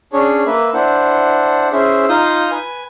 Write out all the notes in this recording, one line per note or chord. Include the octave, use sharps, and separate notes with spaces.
C#4 D4 G#4 C#5
A#3 B4 E5
D4 E4 C5 F#5
C#4 E4 G#4 C5 E5
D#4 F4 F5 D#6 G6
B4 G#5